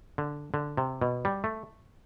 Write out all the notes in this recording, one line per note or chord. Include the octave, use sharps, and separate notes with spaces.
D3
D3
C3
B2
G3
A3